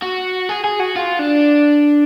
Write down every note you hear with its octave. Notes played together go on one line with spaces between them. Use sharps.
F#4
G#4
G#4
F#4
F4
D4